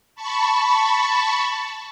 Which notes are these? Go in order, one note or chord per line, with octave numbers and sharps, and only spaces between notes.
A5 B5 C#6